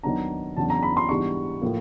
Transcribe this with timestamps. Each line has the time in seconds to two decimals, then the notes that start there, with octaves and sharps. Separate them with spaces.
0.03 D#2 D#3 F#3 B3 D4 A#5
0.57 E2 C#3 F#3 B3 D4 A5
0.70 A#5
0.83 B5
0.97 C6
1.09 G#2 E3 G3 B3 D4 C#6
1.62 A2 F3 A#3